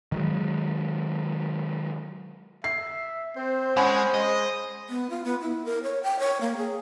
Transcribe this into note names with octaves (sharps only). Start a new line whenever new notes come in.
D#3 F#3 G#3
E5 C7
C4 C5
G#3 C#4 F#5 G#5 B5
G#3 D#5
B3
F4
B3
E4
A#4
C#5
G5
C#5
A#3
G#4